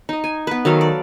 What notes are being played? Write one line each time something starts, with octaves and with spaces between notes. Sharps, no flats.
D#4 D#5
G#5
B3 B4
D#3 F#3 A4 F5
D5